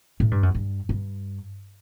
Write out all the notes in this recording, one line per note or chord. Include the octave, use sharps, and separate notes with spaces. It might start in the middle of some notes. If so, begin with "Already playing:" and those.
A2
G2
F#2
G2
G2